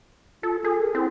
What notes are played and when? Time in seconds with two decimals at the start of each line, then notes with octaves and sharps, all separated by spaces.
0.43 F4 A4
0.64 G#4 A4
0.81 A#4
0.95 C4 E4